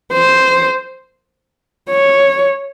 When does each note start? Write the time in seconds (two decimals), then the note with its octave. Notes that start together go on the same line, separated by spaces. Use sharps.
0.13 C5
1.91 C#5